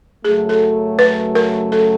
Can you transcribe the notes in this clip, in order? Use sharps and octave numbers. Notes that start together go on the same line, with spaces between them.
F#2 C#3 F#3 A3 G#4
A4
B4
A#4
A4